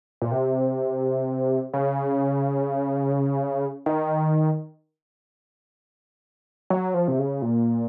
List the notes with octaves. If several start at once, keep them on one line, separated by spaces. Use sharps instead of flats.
A#2
C3
C#3
D#3
F#3
F3
C3
C#3
A#2